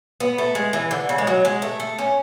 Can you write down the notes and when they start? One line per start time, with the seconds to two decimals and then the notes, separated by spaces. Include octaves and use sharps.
0.20 B3
0.38 A3
0.55 G#3
0.73 E3
0.91 D3
1.09 C#3
1.18 G#3
1.27 F#3
1.45 G#3
1.62 A3
1.80 A3
1.99 C#4